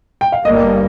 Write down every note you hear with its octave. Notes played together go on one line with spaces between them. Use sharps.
G5
F5
G1 G2 G3 A#3 D#5